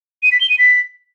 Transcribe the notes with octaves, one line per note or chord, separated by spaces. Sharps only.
D#7
B6
G7
D#7
B6